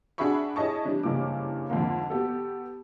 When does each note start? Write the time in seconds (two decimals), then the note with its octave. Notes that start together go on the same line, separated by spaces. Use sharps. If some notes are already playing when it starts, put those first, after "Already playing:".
0.18 D4 F#4 G#4 E5 B5 C#6
0.56 E4 G#4 C#5 D#5 A5 C#6
0.85 E3 G3 D4
1.03 F#1 G2 C#3 E3 D6
1.70 F2 G#2 D3 A#3
2.10 B3 F#4 G4 A4